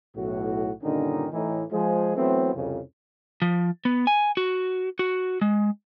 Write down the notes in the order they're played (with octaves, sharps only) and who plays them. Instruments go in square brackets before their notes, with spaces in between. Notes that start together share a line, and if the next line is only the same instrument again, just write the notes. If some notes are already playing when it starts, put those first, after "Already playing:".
[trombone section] B1 A2 F#4
G2 A#2 D3 D#3 C#4 D#4
A2 E3 D#4
F3 G#3 G#4
E3 F#3 A3 B3 C4
C2 F2 C#3
[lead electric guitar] F3
B3
G#5
F#4
F#4
G#3